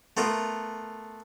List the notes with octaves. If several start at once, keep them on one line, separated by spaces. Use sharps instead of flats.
A3 B3 F4 A#4